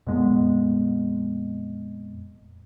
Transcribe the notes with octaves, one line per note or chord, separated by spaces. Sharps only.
F2 A#2 G#3 B3